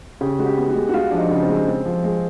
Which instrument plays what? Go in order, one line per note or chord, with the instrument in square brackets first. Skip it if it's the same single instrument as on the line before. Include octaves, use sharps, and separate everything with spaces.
[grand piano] C#3 [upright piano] G4
[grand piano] G#3 [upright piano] F#4
[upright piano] G4
[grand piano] B3
[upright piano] F#4
[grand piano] G#3
[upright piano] F#4
[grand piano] G#3 [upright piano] F4
[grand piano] F3 [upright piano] D4
[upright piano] D#4
[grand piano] C#3
[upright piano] C4
[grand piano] G#3
[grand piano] G#3 [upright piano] C4
[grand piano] F3
G#3